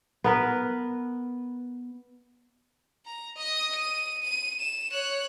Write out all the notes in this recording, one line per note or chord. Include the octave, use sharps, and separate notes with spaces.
B3 A#4 B4
A#5
D#5 D#6
D#7
D#7
E7
C#5 F#6